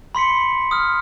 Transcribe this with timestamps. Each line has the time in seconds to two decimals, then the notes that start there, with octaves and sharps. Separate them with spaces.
0.15 B5 C6 B6 C#7
0.71 D#6 F6